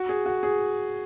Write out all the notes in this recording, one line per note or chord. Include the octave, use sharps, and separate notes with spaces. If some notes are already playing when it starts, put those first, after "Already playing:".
Already playing: F#4
G#4
F#4
G#4